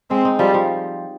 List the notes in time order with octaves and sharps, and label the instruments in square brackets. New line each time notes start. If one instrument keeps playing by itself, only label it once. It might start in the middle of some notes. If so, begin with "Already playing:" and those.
[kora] G#3 [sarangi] C4
[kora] D#4
[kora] F3 [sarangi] G3
[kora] F3